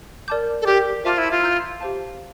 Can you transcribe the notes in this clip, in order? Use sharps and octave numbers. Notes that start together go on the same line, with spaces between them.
A#4 D5 A5 D6 G6
A4
G4 A#4 D5 G5 D6
F4 C5 E5 A5 D6 F6
E4
F4
E5 A#5 E6 G6
G4 C5 F5 A5